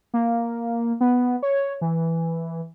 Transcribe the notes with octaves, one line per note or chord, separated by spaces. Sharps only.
A#3
B3
C#5
E3